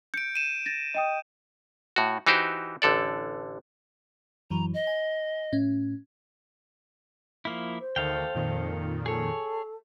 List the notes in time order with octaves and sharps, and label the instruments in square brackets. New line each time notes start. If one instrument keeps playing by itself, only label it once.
[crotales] G6 D7 [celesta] C#7
[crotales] D#7 E7
[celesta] A6 A#6
D#5 G5 D#6
[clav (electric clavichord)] A2 F#4
E3 D#4 F#4 G4 C5
A1 D3 A4 D5
[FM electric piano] F#2 E3 F#3 [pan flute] A#5
[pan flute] D#5
[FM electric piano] G#5
A2 C#4
[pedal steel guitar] F3 A#3 E4
[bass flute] C5
[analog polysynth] D2 D#3 [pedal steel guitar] A4 F5 G5
[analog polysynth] F2 A#2 D#3
[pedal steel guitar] G#4 C#5 [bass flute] A4